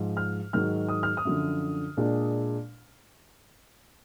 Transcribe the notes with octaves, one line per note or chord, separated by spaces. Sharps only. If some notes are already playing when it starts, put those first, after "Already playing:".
Already playing: G#2 F3 G#3
F6
G#2 D#3 F#3 F6
D#6
F6
D#6
F#2 D3 F3
A#2 G#3 D4